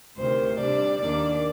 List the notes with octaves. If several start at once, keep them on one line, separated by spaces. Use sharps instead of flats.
D2 C3 D#3 C5
C3 G3 D4 D5
D#2 D#3 A#3 D4 D5